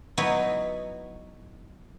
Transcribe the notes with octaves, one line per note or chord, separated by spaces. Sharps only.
F#3 B3 D#4 E4 F#4 B4